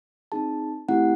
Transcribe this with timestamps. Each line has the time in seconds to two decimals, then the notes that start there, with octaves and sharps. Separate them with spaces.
0.32 C4 D#4 G#4 A5
0.89 A3 C4 E4 G4 F#5